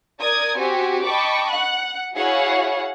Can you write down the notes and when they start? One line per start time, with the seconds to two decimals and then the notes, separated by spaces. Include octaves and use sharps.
0.20 A#4 D5 D#6 G#6
0.57 C4 F#4 G4 G#5
1.03 D#5 G5 A5 B5 C#6 D6
1.50 F#5 F#6
2.16 E4 F#4 G#4 C#5 F5 F#5